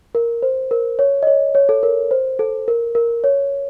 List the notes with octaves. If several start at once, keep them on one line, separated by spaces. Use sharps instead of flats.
A#4
C5
A#4
C#5
D#5
C#5
C#5
A4
A#4
C5
A4
A#4
A#4
C#5